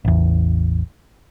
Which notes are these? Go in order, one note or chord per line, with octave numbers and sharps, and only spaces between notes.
A1 E2